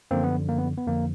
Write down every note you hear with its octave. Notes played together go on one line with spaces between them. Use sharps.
F#2 D3 F3 A#3 C4
B3
A#3
B3
B3
F2 D3 F3 A#3